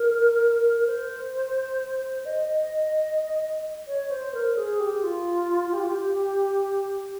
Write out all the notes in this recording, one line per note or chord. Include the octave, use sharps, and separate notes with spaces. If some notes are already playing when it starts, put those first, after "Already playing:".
Already playing: A#4
C5
D#5
C#5
C5
A#4
G#4
G4
F4
G4
F4
G4